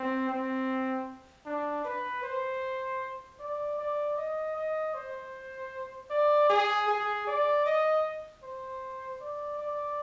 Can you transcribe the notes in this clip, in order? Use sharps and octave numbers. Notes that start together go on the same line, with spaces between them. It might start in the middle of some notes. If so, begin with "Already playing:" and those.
Already playing: C4
C4
D4
B4
C5
D5
D5
D#5
D#5
C5
D5
G#4
G#4
D5
D#5
C5
D5
D5